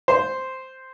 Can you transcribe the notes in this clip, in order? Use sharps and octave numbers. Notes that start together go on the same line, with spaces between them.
C5